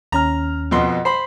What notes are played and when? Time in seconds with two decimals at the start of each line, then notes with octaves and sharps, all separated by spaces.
0.12 D#2 C#4 A#5 F6
0.71 F2 B2 C6
1.05 C5 B5 C7